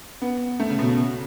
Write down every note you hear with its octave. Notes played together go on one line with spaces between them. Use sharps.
B3
A3
C#3
B2
C#3